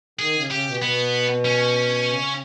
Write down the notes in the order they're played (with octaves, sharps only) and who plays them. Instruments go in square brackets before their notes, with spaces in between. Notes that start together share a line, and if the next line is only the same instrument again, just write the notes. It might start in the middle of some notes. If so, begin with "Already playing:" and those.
[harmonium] D#3 [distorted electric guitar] G#4
[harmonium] C#3
[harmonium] C#3 [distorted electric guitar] G4
[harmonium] B2
[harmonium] B2 [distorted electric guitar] B3
[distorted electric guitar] C#4
[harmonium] C#3
C#3